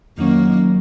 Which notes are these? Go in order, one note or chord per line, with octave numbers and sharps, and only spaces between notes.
F2 D#3 F#3 A#3 C#4